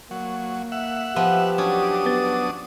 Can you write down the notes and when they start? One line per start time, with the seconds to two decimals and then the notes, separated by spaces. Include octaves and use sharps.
0.11 F#3 A#3
0.72 E5 F#5
1.16 F3 B3 G4
1.58 F#3 C#4 D4 D#6
2.06 B3 B4 A6